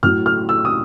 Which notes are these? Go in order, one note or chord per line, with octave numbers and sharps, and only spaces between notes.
A2 F#3 F6
F6
E6
D#6